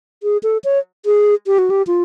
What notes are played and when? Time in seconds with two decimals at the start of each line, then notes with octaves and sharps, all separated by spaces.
0.23 G#4
0.43 A4
0.64 C#5
1.06 G#4
1.47 G4
1.58 F#4
1.70 G4
1.87 F4